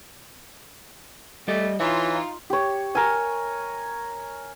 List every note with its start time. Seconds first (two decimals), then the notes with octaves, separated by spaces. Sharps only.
1.48 G3 A3 G4 D#5
1.80 E3 D#4 F4 C#5 E5
2.50 G4 C#5
2.95 A#4 G#5